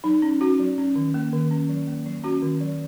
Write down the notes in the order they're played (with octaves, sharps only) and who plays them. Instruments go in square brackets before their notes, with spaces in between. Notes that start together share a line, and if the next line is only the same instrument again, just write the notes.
[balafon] F#3 D#4
C#4
C#4 F#4
F#3
C#4
D#3
A#3
D#3
C#4
F#3
A#3
F#3
C#4 F#4
D#3
F#3